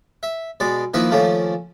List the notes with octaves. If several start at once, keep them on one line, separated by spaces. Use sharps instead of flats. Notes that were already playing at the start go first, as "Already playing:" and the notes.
E5
B2 G#3 D5
D#3 F3 A#3 D#4 E4 B4
D#3 F3 A3 A#3 C#4